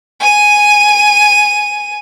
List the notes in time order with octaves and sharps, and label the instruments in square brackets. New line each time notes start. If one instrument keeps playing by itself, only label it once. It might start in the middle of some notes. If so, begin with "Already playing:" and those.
[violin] G#5 D#7